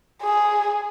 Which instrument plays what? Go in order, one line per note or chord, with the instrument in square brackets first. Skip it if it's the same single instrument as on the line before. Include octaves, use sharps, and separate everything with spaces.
[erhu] G#4